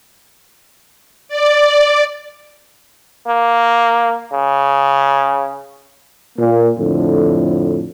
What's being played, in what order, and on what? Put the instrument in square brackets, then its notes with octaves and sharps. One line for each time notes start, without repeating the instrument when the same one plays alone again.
[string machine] D5
[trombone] A#3
C#3
[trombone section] A#2 A#3
F2 A2 D3